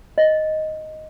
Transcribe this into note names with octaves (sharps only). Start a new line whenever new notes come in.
D#5